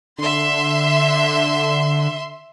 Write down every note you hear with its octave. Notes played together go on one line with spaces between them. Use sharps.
D3 E5 C6